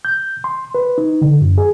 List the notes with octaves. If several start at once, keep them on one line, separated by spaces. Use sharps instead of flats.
G6
C6
B4
D#4
D3
F#2
G#4